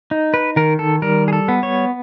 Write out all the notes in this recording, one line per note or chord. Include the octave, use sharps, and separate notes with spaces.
D#4
B4
D#3 A#4
A4
G3 A#4
G#4
A4
B3
C#5